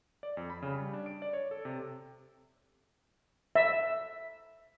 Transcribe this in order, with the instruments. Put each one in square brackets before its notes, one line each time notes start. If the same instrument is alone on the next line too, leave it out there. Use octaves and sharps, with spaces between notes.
[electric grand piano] D5
F2
B5
C#3
G3
D4
D7
D5
C#5
A4
C3
[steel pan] E5